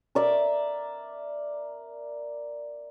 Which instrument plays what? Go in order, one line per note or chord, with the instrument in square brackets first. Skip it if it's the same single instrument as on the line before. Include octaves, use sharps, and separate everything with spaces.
[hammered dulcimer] A#4 D5 E5